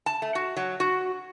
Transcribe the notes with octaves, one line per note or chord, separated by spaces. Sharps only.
A5
A3
F#4
F#3
F#4